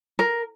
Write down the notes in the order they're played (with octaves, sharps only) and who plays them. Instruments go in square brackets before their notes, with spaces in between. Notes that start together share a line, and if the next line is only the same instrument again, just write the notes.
[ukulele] A#4